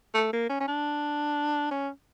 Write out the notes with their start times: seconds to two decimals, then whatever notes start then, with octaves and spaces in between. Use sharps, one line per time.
0.15 A3
0.33 A#3
0.50 C#4
0.61 C#4
0.68 D4
1.71 C#4